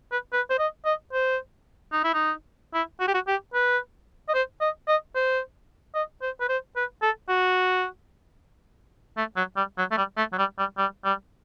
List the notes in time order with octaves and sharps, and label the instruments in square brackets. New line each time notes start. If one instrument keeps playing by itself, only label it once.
[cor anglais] B4
B4
C5
D#5
D#5
C5
D#4
E4
D#4
E4
F#4
G4
F#4
G4
B4
D#5
C5
D#5
D#5
C5
D#5
C5
B4
C5
B4
A4
F#4
A3
F#3
G3
F#3
A3
G3
A3
F#3
G3
G3
G3
G3